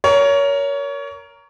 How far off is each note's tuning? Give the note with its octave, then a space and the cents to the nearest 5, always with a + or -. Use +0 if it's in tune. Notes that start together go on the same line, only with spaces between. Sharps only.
A#4 +0 C#5 +25